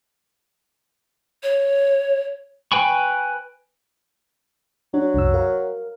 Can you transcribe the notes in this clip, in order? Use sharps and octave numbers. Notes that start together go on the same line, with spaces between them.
C#5
B4 G5 G#5 B5 C#6
F#3 D4
C2 F#2 E6
A#4 F5